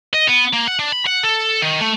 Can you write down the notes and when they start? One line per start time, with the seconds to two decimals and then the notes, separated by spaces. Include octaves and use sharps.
0.14 D#5
0.29 B3
0.53 A#3
0.68 F#5
0.79 D4
0.92 B5
1.06 F#5
1.23 A4
1.62 D#3
1.80 A3